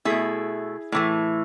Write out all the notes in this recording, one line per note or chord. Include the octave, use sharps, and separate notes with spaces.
B2 A3 E4 G#4
A2 E3 A3